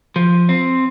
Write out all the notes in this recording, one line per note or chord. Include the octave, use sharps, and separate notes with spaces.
F3
C4